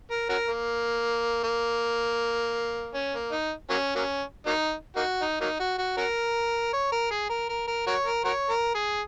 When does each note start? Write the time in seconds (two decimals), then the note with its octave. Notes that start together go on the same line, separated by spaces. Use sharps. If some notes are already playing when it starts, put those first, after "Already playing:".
0.10 A#4
0.29 C#4 F#4 A#4
0.48 A#3
1.43 A#3
2.94 C#4
3.13 A#3
3.32 D#4
3.70 F#3 A#3 C#4
3.95 F#3 A#3 C#4
4.46 F#3 A#3 D#4
4.96 A#3 D#4 F#4
5.21 D#4
5.41 F#3 A#3 D#4
5.59 F#4
5.78 F#4
5.97 C#4 F#4 A#4
6.73 C#5
6.92 A#4
7.11 G#4
7.29 A#4
7.49 A#4
7.67 A#4
7.87 F#4 A#4 C#5
8.06 A#4
8.25 F#4 A#4 C#5
8.50 A#4
8.75 G#4